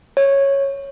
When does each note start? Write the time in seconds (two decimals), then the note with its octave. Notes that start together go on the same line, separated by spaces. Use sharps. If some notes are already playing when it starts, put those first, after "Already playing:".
0.17 C#5